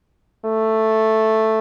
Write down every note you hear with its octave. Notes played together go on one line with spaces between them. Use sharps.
A3